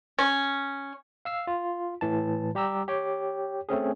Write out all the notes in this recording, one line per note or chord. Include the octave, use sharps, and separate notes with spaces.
C#4
F5 E6 C7
F4
A2 E3 A5
G3 G4 A#5 E6
G4 C#5 G5
A3 C4 C#4 G#4